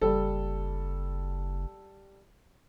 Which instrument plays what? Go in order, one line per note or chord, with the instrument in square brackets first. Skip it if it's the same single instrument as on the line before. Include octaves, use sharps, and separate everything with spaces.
[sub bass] F#1 [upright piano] G3 A4